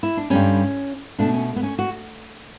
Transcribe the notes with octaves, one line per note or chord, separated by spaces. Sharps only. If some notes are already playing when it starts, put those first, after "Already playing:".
E4
D4
G2 D3 G3 C#4
B2 A3 D4
C#4
B3
C#4
F#4